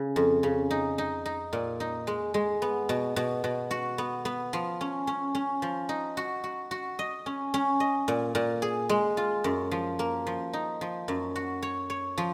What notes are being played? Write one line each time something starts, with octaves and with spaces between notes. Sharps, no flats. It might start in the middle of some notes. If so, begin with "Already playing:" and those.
Already playing: C#3
F2
C#3
D#4
D#4
D#4
A#2
D#4
G#3
G#3
B3
B2
B2
B2
F#4
B3
B3
F3
C#4
C#4
C#4
F3
D#4
F#4
F#4
F#4
D#5
C#4
C#4
D#5
A#2
A#2
G#4
G#3
F4
F#2
F3
A#3
F3
D#4
F3
F#2
F#4
C#5
C#5
F3